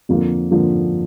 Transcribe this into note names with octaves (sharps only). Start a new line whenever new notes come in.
F2 D3 F3 A#3 F4
D3 F3 A#3 F4